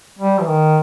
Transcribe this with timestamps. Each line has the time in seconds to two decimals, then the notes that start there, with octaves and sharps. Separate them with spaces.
0.19 G3
0.40 E3
0.48 D#3